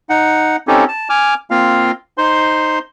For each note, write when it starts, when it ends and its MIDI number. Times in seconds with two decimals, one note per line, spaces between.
0.09 0.56 63
0.09 0.56 78
0.68 0.85 60
0.68 0.85 61
0.68 0.85 63
0.68 0.85 67
0.68 0.85 69
0.88 1.08 81
1.09 1.34 80
1.09 1.34 86
1.09 1.34 89
1.51 1.91 58
1.51 1.91 60
1.51 1.91 65
1.51 1.91 77
2.18 2.79 63
2.18 2.79 72
2.18 2.79 84